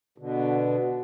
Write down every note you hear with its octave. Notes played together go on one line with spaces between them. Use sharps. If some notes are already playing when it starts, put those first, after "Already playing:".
B2 D3